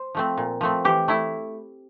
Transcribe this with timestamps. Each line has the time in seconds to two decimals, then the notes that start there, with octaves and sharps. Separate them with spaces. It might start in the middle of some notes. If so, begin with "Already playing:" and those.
Already playing: C5
0.15 F3 A3 C4
0.37 A#2
0.61 F3 A3 C4
0.85 E3 G4
1.08 A3 E4